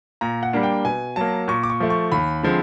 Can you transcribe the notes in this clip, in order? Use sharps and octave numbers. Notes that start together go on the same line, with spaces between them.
A#2 A#5
F#5
G3 A#3 D4
G5
B2 G#5
F#3 A#3 A5
A#2 C#6
D6
C#6
F3 A3
C#6
D#2 B5
D3 F3 G#3 C4